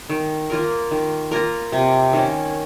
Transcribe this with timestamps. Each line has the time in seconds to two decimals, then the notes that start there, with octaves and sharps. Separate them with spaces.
0.10 D#3
0.50 A#3 F4 A#4
0.91 D#3
1.31 A#3 F4 A#4
1.72 C3
2.13 D#3 A#3 C#4